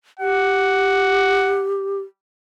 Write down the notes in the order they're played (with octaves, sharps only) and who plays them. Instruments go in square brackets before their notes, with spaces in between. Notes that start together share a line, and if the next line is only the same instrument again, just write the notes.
[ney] G4 [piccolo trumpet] F#5